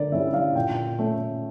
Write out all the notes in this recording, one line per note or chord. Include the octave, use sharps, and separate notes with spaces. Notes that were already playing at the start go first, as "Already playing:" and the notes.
Already playing: D3 A#4 D5
G3 C#4 E4 E5
F5
A#2 G5
A3 C#4